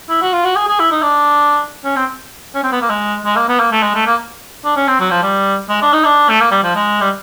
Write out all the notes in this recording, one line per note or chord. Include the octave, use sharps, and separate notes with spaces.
E4
F#4
F4
F#4
G#4
G#4
E4
D#4
D4
C#4
C4
C#4
C4
B3
A#3
G#3
G#3
A#3
B3
A#3
A3
G#3
A3
A#3
D4
C#4
C4
F#3
F3
G3
G#3
D4
D#4
D4
A3
A#3
G3
F3
G#3
G3